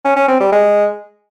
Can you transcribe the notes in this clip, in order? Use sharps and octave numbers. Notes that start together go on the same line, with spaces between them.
C#4
C#4
C4
G3
G#3